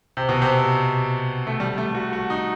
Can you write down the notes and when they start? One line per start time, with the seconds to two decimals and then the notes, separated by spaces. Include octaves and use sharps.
0.17 C3
0.29 B2
0.42 C3
1.47 A3
1.60 G3
1.78 A3
1.95 F#4
2.13 F#4
2.30 D#4